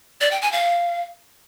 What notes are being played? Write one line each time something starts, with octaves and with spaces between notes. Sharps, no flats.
D5
G5
G#5
F5